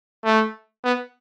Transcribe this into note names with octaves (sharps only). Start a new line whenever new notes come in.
A3
B3